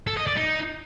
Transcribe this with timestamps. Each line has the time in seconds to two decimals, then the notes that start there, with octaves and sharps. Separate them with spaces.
0.07 A4
0.17 D#5
0.27 D5
0.37 D#4